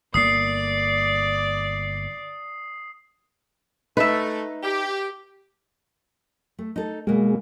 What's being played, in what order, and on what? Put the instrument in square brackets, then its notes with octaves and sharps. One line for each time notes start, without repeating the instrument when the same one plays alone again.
[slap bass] G1 A#3 [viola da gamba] D5 [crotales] D#6 C7
[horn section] A3 [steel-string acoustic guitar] D#4 [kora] B4 E5
[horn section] G4
[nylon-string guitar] A3
D#4 A4
[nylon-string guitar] B2 A#3 [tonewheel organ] G#3